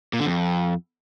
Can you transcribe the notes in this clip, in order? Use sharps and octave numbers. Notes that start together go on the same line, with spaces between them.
A#2
D3
F2